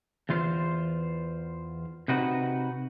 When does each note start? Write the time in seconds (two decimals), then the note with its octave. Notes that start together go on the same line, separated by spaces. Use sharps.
0.29 E2 E3 F4 C5
2.08 C3 D#4 F#4 B4